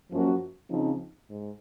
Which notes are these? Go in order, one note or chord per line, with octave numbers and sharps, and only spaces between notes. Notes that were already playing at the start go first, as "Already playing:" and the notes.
F#2 F3 A#3 C#4 F#4
C#3 F3 C4 D#4
G#2